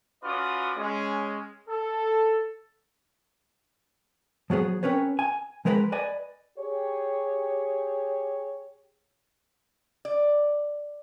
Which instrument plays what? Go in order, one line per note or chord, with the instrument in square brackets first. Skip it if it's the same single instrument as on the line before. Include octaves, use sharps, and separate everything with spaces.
[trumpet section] C#4 F4 F#4 B4 D5 D#6
G#3 C#4
A4
[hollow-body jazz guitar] F3 F#3 B3 G#4
C4 C#4 A#4 B4 C#5
G#5
F3 G#3 A#4 B4 F5 B5
B4 D5 D#5 G#5
[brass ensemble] G4 G#4 C#5
[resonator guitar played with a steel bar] D5